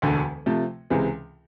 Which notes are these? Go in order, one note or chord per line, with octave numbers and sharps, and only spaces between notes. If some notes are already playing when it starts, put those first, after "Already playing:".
E1 D2 D3
C3 F3 A3
C#2 C3 E3 G#3